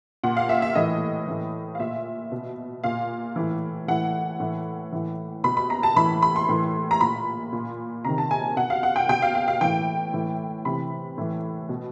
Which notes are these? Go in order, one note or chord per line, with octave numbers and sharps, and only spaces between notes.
A#2 F#5
F5
E5
E5
A2 E3 D#5
A2 E3
F5
A#2 E5
B2
A#2 F5
A2 E3
A2 E3 F#5
A2 E3
A2 E3
B2 B5
B5
A#5
A5
A2 E3 B5
B5
C6
A2 E3
A#5
A#2 B5
A#2
C3 D#3 A#5
A5
G#5
B2 F#5
F5
F#5
G5
B2 G5
F5
F5
F5
A2 E3 G5
A2 E3
C3 E3 B5
A2 E3
B2